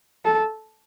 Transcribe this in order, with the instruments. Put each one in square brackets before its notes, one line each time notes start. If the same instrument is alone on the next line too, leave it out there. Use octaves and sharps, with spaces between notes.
[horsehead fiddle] A4